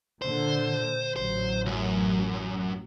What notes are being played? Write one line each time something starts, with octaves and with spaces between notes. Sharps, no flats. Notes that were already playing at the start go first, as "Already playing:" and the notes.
A#2 D3 C5
A1 F#3 C5
C#2 F#2